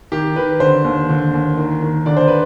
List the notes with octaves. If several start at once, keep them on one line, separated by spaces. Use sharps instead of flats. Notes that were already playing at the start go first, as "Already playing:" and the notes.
D#3 G4
D#3 B4
D3 C5
D#2
D3
D#2
D#3
D#3
D3 D5
C5
B4